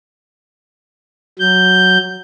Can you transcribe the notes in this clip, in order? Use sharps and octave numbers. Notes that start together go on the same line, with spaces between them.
F#3 G6